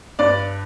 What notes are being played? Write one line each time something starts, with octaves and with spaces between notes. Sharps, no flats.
G2 D5